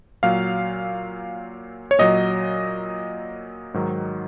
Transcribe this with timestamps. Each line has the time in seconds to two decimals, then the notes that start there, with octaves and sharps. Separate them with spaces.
0.23 A#2 F#3 F5
1.91 C#5
1.99 A#2 F#3 D#5
3.74 G#2 D#3 F#3